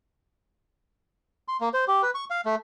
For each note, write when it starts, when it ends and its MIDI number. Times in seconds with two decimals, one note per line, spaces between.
1.48 1.57 84
1.61 1.69 58
1.74 1.85 72
1.88 2.02 67
2.03 2.10 71
2.15 2.25 85
2.30 2.41 77
2.45 2.55 57